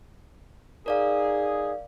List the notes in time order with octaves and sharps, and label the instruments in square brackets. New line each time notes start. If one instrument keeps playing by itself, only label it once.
[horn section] D#4 G#4 [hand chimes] A#4 D5 F5